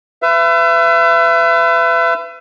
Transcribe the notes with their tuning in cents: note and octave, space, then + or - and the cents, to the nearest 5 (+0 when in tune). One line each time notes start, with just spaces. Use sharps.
B4 +30 E5 +35